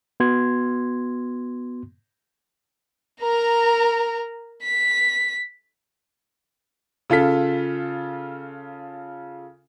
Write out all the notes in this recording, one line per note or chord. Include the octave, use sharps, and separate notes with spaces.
B3 F#4 C6 G#6
A#4 A#5
B6
C#3 F4 A4 B6